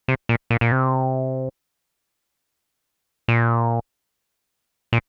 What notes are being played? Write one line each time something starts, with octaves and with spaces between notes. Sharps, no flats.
C3
A#2
A#2
A#2
C3
A#2
A#2